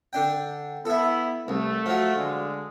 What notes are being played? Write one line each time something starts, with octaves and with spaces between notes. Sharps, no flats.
D3 D4 G5
B3 E4 A4 E5
C2 A3
F3 F#3
D3 G#3